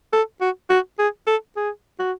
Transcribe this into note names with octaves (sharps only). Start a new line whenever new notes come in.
A4
F#4
F#4
G#4
A4
G#4
F#4